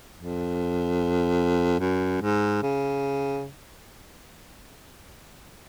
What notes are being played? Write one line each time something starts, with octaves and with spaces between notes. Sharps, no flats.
F2
F#2
G#2
C#3